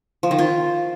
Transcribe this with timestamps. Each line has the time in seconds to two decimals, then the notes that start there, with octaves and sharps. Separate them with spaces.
0.23 F3
0.31 D#3
0.39 F4